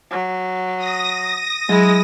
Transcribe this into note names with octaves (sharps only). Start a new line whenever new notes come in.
F#3
D#6 A#6
F#3 G#3 E4